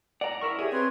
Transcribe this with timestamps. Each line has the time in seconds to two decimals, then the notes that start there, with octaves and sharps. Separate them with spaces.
0.21 D5 F#5 A#5
0.41 E4 A#4 C#6
0.59 G4 G#4 C#5 E5
0.72 C4 B4 C6 G#6